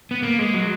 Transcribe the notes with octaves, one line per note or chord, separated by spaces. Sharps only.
B3
A#3
G#3
F#3